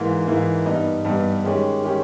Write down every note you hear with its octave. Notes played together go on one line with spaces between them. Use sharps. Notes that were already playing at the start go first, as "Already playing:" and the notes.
Already playing: G#2 E3 A#3
G#2 E3 A#3
G2 G3 B3 D#4
G2 G3 B3 D#4
D#3 G#3 C#4 G4
D#3 G#3 C#4 G4